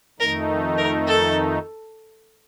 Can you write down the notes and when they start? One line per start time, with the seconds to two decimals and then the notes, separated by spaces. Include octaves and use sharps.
0.20 F2 D#3 A3 D#4 A#4
0.78 A#4
1.07 A4